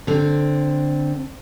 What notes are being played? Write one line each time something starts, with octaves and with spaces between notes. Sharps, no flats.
D3 C4